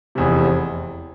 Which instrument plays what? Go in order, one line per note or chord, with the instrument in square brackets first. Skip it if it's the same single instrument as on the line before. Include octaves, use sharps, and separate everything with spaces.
[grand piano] F1 E2 C3